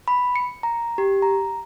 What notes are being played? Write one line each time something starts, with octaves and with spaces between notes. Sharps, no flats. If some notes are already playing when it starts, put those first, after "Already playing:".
B5
C#7
A#5
G4
A#5